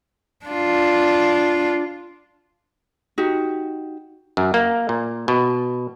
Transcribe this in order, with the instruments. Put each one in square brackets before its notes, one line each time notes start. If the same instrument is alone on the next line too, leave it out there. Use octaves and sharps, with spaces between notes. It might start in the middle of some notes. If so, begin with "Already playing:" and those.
[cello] D4 F4
[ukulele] D#4 F#4 G4
[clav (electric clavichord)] F#2
A#3
A#2
B2